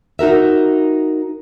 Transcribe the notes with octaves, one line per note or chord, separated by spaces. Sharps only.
D#4 F#4 A#4 E5